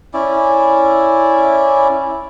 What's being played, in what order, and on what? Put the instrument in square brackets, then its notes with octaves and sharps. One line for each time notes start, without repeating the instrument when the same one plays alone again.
[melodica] C#4 E4 D5